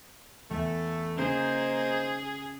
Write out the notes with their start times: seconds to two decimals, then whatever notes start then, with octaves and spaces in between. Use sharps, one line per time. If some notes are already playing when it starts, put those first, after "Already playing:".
0.51 E2 A3
1.18 C#3 A#3 D#4 G#4 C5